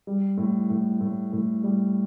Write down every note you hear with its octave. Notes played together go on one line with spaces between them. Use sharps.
G3
A2
A2
A2
A2
G3